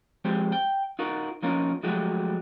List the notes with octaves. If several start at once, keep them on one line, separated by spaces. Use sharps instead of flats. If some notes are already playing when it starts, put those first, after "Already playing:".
F3 G#3 C4 G4
G5
D#4 F4 F#4 A#4
F3 A#3 C#4 D#4 F4 A#4
F3 F#3 G#3 A3 F#4 G4